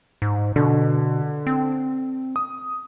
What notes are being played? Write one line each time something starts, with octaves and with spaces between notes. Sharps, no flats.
G#2
B2 D3
C4
D#6